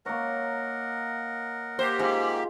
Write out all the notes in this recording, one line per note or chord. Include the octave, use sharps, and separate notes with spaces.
A#3 A#4 C#5 D#5 F#5
A#3 G4 C5
G#2 F4 G#4